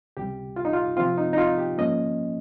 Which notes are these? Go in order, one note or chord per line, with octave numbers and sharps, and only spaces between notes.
C#2 C3 G3 G4
F4
D#4
F4
C3 F3 C4 F4
D#4
D#4
F4
G4
G#2 F3 A#3 C#4 D#5